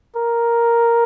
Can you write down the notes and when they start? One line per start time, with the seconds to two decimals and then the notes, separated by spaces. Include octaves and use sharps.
0.16 A#4